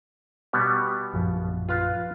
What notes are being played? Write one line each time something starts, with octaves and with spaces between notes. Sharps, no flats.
B2 G3 B3
A#1 F#2 F3
F4 B4 F5